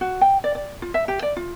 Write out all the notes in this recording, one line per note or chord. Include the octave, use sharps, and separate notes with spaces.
F#4
G5
D5
D5
F4
E5
G4
D5
F4